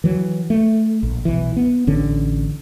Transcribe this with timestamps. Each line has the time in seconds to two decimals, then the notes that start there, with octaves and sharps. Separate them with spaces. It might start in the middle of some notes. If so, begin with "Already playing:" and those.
0.04 E3 F#3
0.50 A3
1.03 A#1
1.25 B1 E3
1.57 B3
1.87 A1 D3 C#4